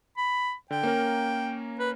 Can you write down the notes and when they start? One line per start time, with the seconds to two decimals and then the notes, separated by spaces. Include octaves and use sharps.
0.17 B5
0.71 D3 G5
0.83 A#3 C#4 A#4
1.79 B4